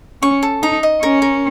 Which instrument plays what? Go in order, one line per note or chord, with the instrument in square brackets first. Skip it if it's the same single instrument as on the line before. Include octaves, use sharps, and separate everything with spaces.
[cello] C#4 [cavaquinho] C#6
[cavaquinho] A4
[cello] D#4 [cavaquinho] A#5
[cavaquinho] D#5
[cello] C#4 [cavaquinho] A#4
[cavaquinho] A#4